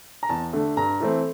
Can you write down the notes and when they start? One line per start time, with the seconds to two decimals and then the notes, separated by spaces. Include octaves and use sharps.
0.23 A#5
0.29 E2 A5
0.53 D3 A3
0.77 G2 A#5
1.00 E3 A3 C4